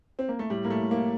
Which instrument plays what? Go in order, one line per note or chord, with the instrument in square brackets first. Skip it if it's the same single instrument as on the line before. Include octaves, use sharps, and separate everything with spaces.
[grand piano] C4
A#3
A3
A2 G3
A2 A#3
A3
A2
A#3
A2